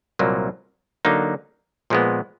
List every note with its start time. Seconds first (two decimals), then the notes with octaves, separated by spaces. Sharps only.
0.19 C2 A#2 F#3 A#3
1.05 D3 F#3 A#3 D#4
1.90 A#2 F3 G#3 B3